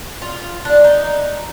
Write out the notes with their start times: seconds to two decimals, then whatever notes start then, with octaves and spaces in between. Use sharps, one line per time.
0.22 F4
0.65 D4
0.84 D#4